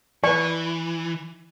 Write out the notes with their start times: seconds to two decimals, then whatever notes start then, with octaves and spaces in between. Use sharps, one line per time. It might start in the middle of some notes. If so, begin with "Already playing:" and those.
0.24 E3 B4 D5 C#6